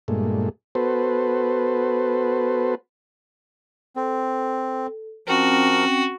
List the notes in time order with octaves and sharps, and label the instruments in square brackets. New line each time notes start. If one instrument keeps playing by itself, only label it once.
[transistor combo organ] G2 A#2 G#3 A3
B3 F#4 A4 B4 C5
[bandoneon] C4 [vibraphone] A4
[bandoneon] F3 A#4 [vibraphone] C4 C#4 G5 [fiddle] F#4